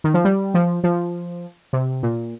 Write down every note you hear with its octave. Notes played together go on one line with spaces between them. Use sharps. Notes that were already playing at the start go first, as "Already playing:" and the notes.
D#3
F3
G3
F3
F3
C3
A#2